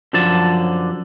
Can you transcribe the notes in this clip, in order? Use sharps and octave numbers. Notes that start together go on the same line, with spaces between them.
F#2 D3 F3 D5 A5